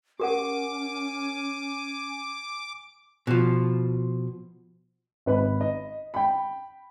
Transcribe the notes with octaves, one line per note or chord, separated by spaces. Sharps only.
C#4 G4 A#4 F#5 G#5 D6
B2 F3
G#1 B4 B5
D#5
G5 B5